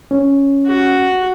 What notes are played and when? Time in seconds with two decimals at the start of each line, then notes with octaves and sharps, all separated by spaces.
0.11 C#4
0.67 F#4